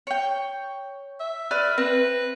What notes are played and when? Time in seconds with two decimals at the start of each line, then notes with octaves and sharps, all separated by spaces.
0.07 C#5 G5
1.20 E5
1.51 B4 D5 F6
1.78 C4 B4